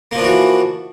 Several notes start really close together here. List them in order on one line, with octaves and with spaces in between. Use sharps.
A#3 F3 D4 E3 F#4